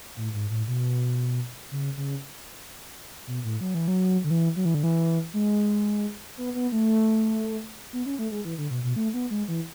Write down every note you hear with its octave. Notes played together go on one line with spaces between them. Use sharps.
A2
G#2
A2
B2
C#3
C#3
B2
A2
F#3
E3
F#3
D3
E3
F#3
E3
D3
E3
G#3
B3
B3
A3
B3
C#4
A3
G#3
E3
D3
B2
B2
A3
B3
G#3
E3